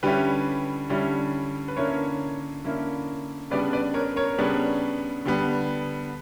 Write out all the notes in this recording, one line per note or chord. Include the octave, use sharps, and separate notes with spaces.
D3 G3 C#4 E4 G4 B4
D3 G3 C#4 E4
B4
D3 A#3 C#4 E4 A#4 C#5
D3 A#3 C#4 E4
C#3 G3 B3 D4 B4 D5
B4 D5
A#4 C#5
A#4 C#5
C#3 G3 B3 D4
D3 G3 B3